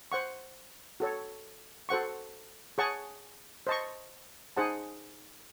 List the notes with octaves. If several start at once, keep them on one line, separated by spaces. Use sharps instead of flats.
C5 F#5 C#6
F#4 A4 C#5
F#4 A4 C5 F#5 C#6
G#4 C#5 F#5 A5 C#6
C5 D#5 A5 C#6
D#4 G#4 C5 F#5 A5